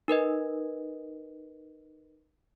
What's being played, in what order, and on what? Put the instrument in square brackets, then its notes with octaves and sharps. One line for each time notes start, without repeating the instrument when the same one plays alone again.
[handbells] D#4 A#4 B4 D#5